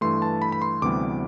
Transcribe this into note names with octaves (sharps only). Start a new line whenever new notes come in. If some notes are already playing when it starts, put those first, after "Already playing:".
G2 E3 A3 C6
A5
B5
B5
C6
D2 C3 E3 G3 B3 D6